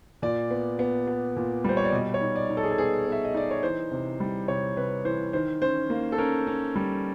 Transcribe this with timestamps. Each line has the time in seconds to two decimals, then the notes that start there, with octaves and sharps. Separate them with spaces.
0.22 A#2 D5
0.51 B3
0.79 B3
1.07 B3
1.36 A#2
1.64 G3 C5
1.77 C#5
1.85 D5
1.93 B2 D#5
2.14 C#5
2.21 D#4
2.36 D5
2.50 D#4
2.57 A4
2.63 G#4
2.71 A4
2.78 B3 G#4
3.06 B3
3.12 E5
3.25 D#5
3.34 D#4 D5
3.51 C#5
3.63 E3 C5
3.92 C3
4.20 G3
4.48 C3 C#5
4.77 C3 B4
5.05 E3 C5
5.33 D#3 C5
5.62 C#4 C5
5.90 A#3
6.12 A4
6.18 C#4 A#4
6.47 C#4
6.76 G3